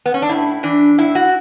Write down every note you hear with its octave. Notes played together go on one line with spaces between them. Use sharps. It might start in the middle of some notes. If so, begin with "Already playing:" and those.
B3
C#4
D4
A2 E4
E3 D4
A2 E4
F#4